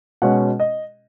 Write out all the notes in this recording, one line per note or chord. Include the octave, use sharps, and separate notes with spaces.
B2 G#3 C#4 F#5
D#5